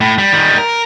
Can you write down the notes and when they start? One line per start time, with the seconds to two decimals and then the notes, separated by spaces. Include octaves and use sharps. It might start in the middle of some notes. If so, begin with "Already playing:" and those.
0.01 A2
0.18 G3
0.33 D#3 G3
0.58 A#4